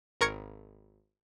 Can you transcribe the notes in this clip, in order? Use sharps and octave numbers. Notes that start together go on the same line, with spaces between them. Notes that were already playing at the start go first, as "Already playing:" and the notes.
G#1 A#4 C#6 G#6 C#7